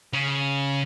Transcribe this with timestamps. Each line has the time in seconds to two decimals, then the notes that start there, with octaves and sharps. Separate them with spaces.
0.13 C#3